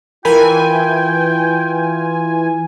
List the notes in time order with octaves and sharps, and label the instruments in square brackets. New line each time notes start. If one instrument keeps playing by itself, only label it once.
[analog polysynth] E3 G#5 [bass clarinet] F4 [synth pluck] A#4 B5 [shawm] G5